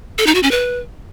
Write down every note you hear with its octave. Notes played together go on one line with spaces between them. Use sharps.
A4
D#4
F#4
C#4
B4